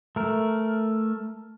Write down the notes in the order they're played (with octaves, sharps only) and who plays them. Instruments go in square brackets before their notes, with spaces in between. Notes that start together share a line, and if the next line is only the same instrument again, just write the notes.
[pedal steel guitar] A3 A#4